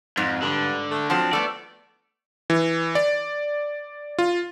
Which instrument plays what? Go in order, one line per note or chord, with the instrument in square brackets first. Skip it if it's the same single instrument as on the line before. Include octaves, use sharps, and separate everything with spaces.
[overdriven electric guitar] F2 [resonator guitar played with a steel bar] G#2
[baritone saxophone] G2 [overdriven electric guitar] D3
[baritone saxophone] A3
[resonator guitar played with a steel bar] F3 F#3 C4 [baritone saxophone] D4
[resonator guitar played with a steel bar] A3 B3 [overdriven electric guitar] D5
[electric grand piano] E3
D5
F4